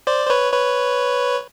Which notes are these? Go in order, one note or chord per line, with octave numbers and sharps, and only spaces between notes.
C5 D5
C5
B4 C#5
B4 C#5